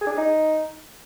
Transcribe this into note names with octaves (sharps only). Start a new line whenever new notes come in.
G#4
D4
G#4
D#4